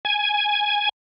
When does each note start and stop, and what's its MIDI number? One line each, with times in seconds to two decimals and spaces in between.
0.05 0.89 80